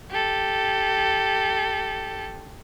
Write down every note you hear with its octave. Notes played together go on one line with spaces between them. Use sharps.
G4 A4